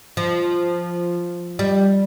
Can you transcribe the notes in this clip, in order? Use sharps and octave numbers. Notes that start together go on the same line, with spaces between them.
F3
G3